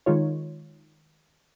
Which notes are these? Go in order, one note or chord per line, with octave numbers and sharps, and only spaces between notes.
D#3 G#3 D#4 F4 C#5